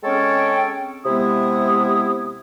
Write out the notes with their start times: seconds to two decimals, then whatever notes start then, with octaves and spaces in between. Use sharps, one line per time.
0.03 G#3 C4 C#4 A4 C#5 G5
1.05 C3 G#3 B3 E4 D#6